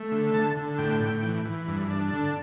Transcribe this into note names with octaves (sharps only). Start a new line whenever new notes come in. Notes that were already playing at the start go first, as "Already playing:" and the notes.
Already playing: A3
D3
D3 A5
D3
A2 G5
A2
E3
E3
G2
D4
D3